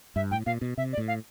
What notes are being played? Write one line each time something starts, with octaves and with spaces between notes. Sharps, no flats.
G2 E5
A2 G5
A#2 F5
B2
C3 E5
D5
A2
F5